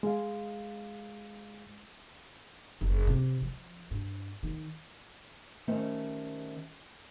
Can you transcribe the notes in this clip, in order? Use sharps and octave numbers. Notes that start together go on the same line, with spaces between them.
G#3 F5
F#1
C3
F3
G2
D#3
D#3 G3 A3 C#4 C5